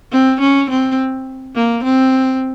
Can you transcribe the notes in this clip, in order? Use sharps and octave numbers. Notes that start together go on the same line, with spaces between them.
C4
C#4
C4
A#3
C4